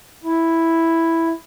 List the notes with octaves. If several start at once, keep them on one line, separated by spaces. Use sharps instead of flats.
E4